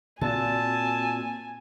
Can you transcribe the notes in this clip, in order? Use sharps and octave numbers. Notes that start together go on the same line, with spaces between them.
A#2 C4 F#4 G#5 A5 E6